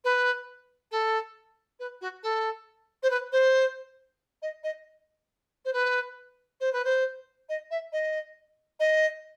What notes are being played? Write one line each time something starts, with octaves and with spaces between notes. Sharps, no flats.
B4
A4
B4
F#4
A4
C5
B4
C5
D#5
D#5
C5
B4
C5
B4
C5
D#5
E5
D#5
D#5